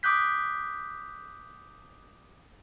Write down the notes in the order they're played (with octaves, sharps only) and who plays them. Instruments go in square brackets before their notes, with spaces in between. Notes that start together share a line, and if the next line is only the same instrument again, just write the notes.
[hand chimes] D6 D#6 F#6 G6 B6